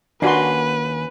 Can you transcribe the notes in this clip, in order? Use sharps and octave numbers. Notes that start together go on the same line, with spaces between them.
D#2 A#3 C#4 D4 F#4 B4 C6